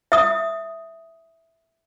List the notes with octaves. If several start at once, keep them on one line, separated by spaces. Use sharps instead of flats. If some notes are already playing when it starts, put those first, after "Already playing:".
E5 D#6